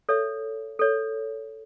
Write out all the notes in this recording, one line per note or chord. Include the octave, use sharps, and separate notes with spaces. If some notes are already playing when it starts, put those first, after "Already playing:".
A4 C#5 E5
A4 C#5